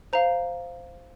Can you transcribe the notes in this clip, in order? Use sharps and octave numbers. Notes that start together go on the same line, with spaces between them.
C5 F5 A#5